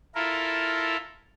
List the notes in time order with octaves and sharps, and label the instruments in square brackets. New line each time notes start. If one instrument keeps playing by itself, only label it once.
[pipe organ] E4 F4 A4 A#4